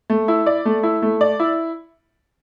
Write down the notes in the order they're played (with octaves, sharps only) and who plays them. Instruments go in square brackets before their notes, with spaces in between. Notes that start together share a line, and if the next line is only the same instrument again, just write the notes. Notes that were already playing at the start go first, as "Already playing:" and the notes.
[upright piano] A3
E4
D5
A3
E4
A3
D5
E4